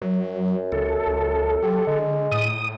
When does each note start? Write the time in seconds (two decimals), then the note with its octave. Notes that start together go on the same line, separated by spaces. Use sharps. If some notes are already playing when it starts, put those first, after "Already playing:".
0.02 F#2 F#3
0.72 C#2 A4
1.07 C#2
1.63 F#3 G4
1.87 D3 G#3
2.32 A2 D#6